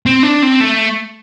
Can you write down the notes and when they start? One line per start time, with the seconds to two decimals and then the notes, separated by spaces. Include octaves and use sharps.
0.06 C4
0.23 D4
0.43 C4
0.61 A3